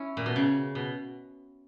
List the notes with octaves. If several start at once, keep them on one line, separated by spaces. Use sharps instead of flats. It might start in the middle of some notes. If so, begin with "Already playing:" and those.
Already playing: C#4 E4
A#2
B2
C#3
B2